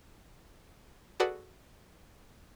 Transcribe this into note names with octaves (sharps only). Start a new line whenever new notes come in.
F#4 G#4 A4 B4 D5 F#5